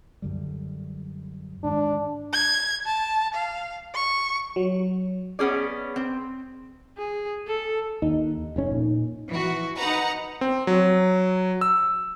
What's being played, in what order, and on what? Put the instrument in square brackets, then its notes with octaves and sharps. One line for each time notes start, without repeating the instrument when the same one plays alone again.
[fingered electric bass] F#2 D3 G3
[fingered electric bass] G#2 D#3 [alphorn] D4
[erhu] G#6
A5
F5
C#6
[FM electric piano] F#3
[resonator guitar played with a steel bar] B3 C#4 G#4 D5
C4
[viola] G#4
A4
[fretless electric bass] D#2 [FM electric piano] D#4
[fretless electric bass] F1 A2 C#4
A#2
[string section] E3 F#4
D#4 B4 F#5 A#5
[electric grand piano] C4
F#3
E6